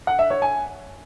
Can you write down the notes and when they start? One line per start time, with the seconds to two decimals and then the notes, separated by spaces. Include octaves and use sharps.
0.07 F#5
0.19 E5
0.30 C#5
0.42 G#5